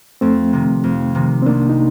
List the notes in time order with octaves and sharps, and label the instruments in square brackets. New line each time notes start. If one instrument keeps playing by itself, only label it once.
[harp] F2 [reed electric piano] A3 C4
[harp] C3 D#3
F2
C3 D#3
[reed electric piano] C4
[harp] C2 [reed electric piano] A#3 D4
[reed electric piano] D#4